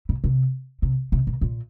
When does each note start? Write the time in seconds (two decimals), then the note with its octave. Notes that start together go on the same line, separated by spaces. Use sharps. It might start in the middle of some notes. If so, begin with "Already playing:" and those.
0.09 B2
0.24 C3
0.82 C3
1.12 C3
1.27 B2
1.41 A#2